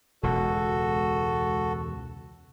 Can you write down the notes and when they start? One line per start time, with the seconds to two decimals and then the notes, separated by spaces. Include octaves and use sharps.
0.23 E1 C#2 B2 F#4 A4